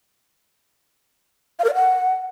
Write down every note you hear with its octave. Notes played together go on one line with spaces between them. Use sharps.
F5
A#4
D5
F#5